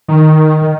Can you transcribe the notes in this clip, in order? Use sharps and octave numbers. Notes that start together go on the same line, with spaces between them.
D#3
D#3